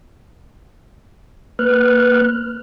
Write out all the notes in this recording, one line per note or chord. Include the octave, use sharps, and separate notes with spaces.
A#3 B4 F6 F#6